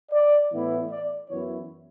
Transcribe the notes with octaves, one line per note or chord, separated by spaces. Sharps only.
D5
A2 E3 B3 E4
D5
F#2 E3 B3 E4 C#5